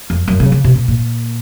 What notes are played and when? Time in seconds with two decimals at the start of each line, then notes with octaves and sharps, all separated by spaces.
0.10 F2
0.28 F#2
0.40 C#3
0.52 C#3
0.64 C3
0.76 A#2
0.88 A#2